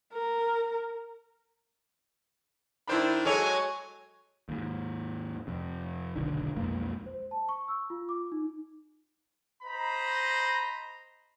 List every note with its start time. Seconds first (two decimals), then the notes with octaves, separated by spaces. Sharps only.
0.13 A#4
2.87 D#3 D4 E4 C5 B5
3.25 F#3 G#3 A4 C#5 G#5
4.49 D#2 G#2
5.47 F2 C3
6.16 F1 B1 D3 D#3
6.56 B1 F2 G#3 A#3
7.06 C5
7.31 A5
7.49 C#6
7.68 E6
7.90 F4
8.09 D6
8.32 D#4
9.63 C5 D#5 A#5 B5